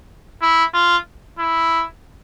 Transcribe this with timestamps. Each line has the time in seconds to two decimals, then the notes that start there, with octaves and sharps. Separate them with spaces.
0.42 E4
0.74 F4
1.39 E4